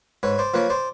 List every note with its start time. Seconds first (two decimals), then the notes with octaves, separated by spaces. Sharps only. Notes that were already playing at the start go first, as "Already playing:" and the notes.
0.23 G#2 B4 C#5
0.39 C5 D5
0.54 F3 A#3 B4 C#5
0.70 C5 D5